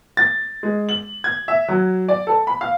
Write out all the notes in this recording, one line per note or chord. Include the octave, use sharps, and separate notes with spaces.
A6
G#3
F#7
G#6
E5
F#3
D5
A4
B5
F5